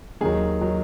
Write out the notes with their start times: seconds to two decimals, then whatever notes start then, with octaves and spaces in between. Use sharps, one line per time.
0.21 D#2 D#3 F#3 G#4
0.61 D#3 F#3